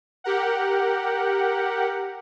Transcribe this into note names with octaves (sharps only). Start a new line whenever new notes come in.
G4 A#4 F#5